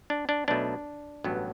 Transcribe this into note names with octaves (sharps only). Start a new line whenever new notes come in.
D4
D4
B1 B2 A3 D4
A1 G2 F#3 B3